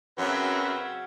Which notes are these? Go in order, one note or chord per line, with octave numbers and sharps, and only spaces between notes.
F#2 C#3 F#3 C4 B4 E5